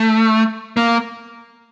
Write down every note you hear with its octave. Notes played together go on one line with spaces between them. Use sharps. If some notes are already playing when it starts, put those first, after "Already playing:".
Already playing: A3
A#3